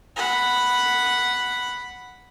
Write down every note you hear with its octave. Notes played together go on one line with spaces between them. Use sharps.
F#5 B5